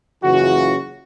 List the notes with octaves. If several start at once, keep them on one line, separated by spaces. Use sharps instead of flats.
F#1 C#3 E3 F4 F#4